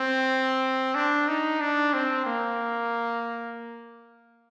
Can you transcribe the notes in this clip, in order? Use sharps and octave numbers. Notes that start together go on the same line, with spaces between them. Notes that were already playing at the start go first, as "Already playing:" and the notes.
Already playing: C4
D4
D#4
D4
C4
A#3